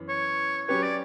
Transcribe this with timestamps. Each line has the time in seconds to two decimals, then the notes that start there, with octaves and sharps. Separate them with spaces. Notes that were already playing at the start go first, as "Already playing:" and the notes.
Already playing: F#2 E3 B3
0.09 C#5
0.68 F#3 C#4 G4 B4 C#5
0.83 D5